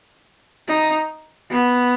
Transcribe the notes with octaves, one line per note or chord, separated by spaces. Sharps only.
D#4
B3